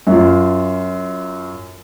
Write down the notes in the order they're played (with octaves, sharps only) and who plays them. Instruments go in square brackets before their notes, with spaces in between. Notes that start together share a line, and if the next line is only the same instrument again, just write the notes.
[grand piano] F#2 F4